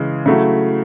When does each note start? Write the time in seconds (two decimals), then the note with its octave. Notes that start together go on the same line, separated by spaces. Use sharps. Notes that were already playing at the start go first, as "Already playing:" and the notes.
Already playing: C#3 E3 G#3
0.26 C#3 F#3 A3 E4